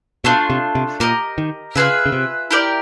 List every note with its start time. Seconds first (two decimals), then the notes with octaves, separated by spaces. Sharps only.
0.24 B2 A3 D4 F4
0.50 C3
0.75 C3
1.00 A#2 G4 A#4 D#5
1.38 D#3
1.75 C#3 F4 G#4 B4 E5
2.06 C#3
2.12 C3
2.51 E4 G4 A#4 D5